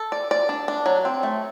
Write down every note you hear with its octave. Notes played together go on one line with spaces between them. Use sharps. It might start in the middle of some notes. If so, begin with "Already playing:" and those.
Already playing: A4
D5
D5
D4
D4
F#3
C4
A3